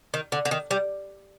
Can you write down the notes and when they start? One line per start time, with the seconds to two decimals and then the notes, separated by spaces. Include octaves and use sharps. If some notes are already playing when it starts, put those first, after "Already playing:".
0.14 D#3
0.32 D3
0.45 D3
0.51 D#3
0.71 G3